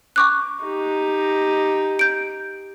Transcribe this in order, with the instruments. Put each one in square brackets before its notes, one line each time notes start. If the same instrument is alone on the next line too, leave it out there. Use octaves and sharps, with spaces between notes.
[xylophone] C#6 D6 F#6
[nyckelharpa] D#4 G4
[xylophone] G6 D7